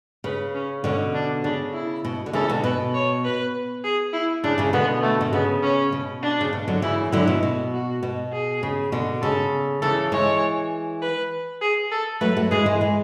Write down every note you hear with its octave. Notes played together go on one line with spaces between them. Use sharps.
C#3 B4
C#4
B2 D3 C#4
D4
C#3 D4
E4
B2
D3
C#3 E3 A4
B2 D3
B2 B4
C#5
B4
G#4
E4
C#3 D4
C#3 E3
B2 D3 B3
A3
B2
C#3 B3
C#4
B2
D4
C#3
B2
D3 F#3
C#3 E3 E4
D3 F#3 E4
B2
B2
F#4
B2
G#4
C#3
B2 D3
C#3 A4
C#3 E3 A4
E3 G#3 C#5
B4
G#4
A4
F#3 A3 B4
F#3 A3
E3 G#3 G#4
E3 G#3
E3 G#3